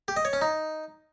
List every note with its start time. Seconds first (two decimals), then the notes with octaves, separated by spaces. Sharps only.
0.08 G4
0.17 D#5
0.25 C#5
0.33 C#4
0.41 D#4